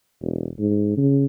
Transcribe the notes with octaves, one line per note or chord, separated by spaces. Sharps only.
E1
G#2
C#3